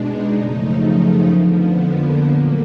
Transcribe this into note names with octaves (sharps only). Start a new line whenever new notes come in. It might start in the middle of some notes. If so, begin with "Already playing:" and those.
Already playing: B2 G#3 D4 D#4
F#2 C#3 F3 A3
A3
F2 D3 F3 B3
A#3
A#2 F#3 A3 A#3